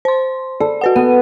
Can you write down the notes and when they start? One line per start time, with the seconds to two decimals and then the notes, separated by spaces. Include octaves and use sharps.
0.05 C5 C6
0.60 A4 D5
0.81 F#4 B4 F#5
0.96 B3 D#7